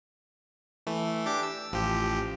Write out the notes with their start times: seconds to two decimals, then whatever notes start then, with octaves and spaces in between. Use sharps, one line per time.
0.87 E3 A3
1.26 D4 G4 D6
1.43 E6
1.72 A1 F3 G4